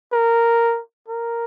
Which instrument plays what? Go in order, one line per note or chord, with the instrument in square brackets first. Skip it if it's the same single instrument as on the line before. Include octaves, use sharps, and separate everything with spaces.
[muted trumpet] A#4
A#4